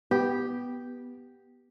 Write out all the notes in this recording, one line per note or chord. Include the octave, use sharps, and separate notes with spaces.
B3 G4